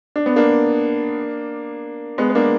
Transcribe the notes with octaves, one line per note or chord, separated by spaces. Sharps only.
D4
B3
A#3 D4
G#3 B3
B3
A#3 D4